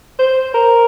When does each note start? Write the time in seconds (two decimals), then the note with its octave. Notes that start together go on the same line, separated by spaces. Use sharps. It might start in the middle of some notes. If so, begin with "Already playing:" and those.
0.19 C5
0.54 A#4